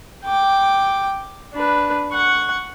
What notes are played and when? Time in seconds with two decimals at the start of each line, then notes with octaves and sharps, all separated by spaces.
0.25 G5 D6
1.53 D4 B4
2.12 F#5 C#6